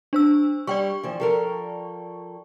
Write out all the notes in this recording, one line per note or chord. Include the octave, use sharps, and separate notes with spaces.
D4 C5 E6
G3 D5 G5 C#6
E3 F3
F3 A4 A#4